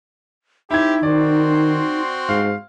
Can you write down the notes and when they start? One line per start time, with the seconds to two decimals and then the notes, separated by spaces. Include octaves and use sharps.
0.71 C4 D#4 E4 G4 G5 G#6
1.03 D#3 C4 F#4 D5 C6
2.29 G#2 F5